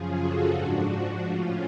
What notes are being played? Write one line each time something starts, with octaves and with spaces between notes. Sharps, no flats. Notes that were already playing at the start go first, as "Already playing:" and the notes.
Already playing: F#2 C#3 F3 F4 G#4
F#4 A4
G#2 F3 D4 F#4
D4
A2 F3 C#4 F4